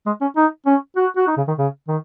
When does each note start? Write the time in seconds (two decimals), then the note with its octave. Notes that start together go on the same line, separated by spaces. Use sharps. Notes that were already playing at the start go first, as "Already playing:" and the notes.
0.06 G#3
0.21 C#4
0.37 D#4
0.66 C#4
0.97 F#4
1.17 F#4
1.27 D#4
1.37 C#3
1.48 D#3
1.58 C#3
1.88 D#3